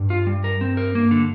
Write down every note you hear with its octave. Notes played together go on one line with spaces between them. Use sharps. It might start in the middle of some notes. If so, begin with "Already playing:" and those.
Already playing: G2
F4
G3
A#4
C4
A#4
G2 A#3
D3